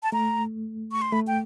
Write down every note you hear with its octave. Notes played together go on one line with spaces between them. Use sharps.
A5
A3 A#5
C#6
C6
A3 B5
G5